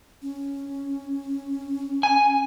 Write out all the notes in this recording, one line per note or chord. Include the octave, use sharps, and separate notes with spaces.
C#4
G#5